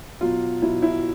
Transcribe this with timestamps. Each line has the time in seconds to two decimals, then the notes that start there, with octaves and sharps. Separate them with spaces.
0.21 B2 F#3 F4
0.62 B2 F#3 E4
0.82 E4